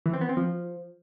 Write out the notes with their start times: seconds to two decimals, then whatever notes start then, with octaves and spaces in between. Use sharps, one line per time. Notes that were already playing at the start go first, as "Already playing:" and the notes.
0.06 E3
0.13 C4
0.21 B3
0.29 C4
0.37 F3